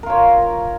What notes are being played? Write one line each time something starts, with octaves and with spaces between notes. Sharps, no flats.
F4 A#4 C#5